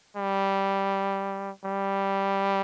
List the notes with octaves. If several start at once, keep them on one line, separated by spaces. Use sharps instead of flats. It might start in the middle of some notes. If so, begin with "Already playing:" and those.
G3
G3